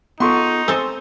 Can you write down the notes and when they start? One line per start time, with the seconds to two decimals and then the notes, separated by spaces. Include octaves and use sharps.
0.20 B3 D#4 F4 A4 C6 C#6
0.68 C4 A4 G#5